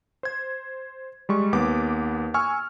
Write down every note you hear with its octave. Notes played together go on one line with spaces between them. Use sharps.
C5 G#6
G3 G#3 C#6
D#2 B3 D6
G#5 C#6 E6 F6